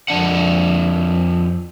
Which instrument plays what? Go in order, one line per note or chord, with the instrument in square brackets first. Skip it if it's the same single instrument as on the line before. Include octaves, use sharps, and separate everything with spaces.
[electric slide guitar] F2 D4 F#5